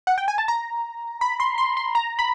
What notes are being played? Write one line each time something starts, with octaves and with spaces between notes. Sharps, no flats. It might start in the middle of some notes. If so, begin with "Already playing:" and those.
F#5
G5
G#5
A5
A#5
B5
C6
C6
C6
A#5
B5